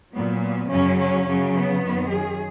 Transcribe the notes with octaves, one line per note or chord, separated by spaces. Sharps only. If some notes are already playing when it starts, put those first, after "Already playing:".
A#2 F#3 B3
B3
F#2 C#3 F#3 C#4
C#4
F#2 C#3 F#3
B3
F#2 D#3 F#3
G#4